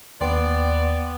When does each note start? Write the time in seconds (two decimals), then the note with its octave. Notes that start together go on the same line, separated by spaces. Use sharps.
0.21 D#2 B3 B4 D5 G5 C6